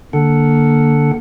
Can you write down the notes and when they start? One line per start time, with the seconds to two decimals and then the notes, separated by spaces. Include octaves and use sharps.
0.13 D3 A#3 A4 F#5